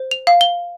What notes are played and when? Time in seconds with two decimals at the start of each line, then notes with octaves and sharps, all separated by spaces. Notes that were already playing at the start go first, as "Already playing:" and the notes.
Already playing: C5
0.11 F7
0.27 F5
0.41 G7